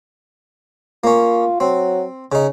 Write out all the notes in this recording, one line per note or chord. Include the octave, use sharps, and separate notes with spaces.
A#3 C#4 F4
F#3 C4
C#3 C#4 D#4